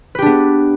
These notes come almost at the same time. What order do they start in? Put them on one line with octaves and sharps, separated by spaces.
B4 G4 D4 B3